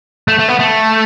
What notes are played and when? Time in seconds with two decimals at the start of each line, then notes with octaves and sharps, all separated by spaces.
0.28 A3
0.39 A3
0.48 B3
0.59 A3